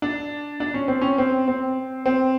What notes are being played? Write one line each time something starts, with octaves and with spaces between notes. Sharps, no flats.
D4
D4
C#4
C4
C#4
C4
C4
C4